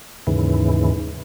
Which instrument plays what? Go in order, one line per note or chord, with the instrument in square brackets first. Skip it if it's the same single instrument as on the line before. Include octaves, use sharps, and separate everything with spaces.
[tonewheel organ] D#2 G#2 C#3 E3